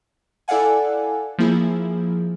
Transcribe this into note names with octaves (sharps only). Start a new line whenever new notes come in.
E4 A4 D5 F5 F#5 G#5
F3 A#3 E4 G#4